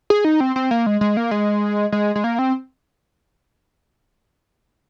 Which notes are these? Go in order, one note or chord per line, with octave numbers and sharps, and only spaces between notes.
G#4
D#4
C4
C4
A#3
G#3
G#3
A#3
G#3
G#3
G#3
A#3
C4